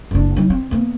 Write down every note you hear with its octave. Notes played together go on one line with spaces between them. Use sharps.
F#1 D4
F#3 D#4
C4
A#3 B3